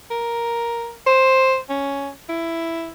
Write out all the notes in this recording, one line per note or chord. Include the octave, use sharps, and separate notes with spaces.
A#4
C5
C#4
E4